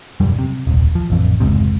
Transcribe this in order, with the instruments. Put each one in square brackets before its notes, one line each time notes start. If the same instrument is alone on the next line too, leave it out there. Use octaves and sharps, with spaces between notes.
[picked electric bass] E1 F#2 G3
C3
D#1 C2
F3
A1 F2
F1 C#2 G#2 C3